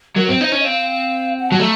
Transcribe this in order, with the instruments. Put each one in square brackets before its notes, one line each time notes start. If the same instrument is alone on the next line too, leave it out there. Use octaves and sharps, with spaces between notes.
[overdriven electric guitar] F#3 [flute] A#4
[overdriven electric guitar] C4 [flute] C5
[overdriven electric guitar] D#4 [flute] C5
[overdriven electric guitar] C#4 [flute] D#5
[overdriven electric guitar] C4 [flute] F5
[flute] F#5
[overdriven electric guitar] F#3 [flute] A5
[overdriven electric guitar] A3 [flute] A#5